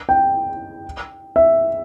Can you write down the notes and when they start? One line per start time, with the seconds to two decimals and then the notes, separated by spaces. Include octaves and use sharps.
0.09 G5
1.36 E5